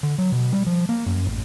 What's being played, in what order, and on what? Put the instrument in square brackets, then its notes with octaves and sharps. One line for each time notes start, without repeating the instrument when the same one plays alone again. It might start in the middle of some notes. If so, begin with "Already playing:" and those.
[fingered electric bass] D3
F#3
B2
G3
F3
A#3
F#2
A1